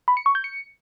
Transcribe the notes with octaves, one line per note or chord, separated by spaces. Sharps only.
B5
C#7
C#6
G6
C#7